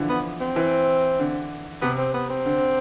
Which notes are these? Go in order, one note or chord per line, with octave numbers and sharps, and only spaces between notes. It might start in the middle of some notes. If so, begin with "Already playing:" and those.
Already playing: D3 E3 F3
B3
C4
E3
D3
C3 B3
C4
B3
C4
D3